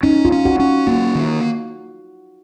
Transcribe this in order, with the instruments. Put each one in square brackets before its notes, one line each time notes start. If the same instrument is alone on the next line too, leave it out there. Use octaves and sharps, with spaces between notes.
[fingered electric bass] C#4 [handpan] D#4
[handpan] F4
[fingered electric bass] C#4
[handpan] F#4
[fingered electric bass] C#4
[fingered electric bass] A#3 [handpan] F#4
[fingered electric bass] D#3